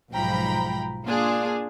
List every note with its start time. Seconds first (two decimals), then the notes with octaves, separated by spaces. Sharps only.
0.11 B1 G#2 F3 G5 A#5 B5
1.04 A#3 D4 F4 G#4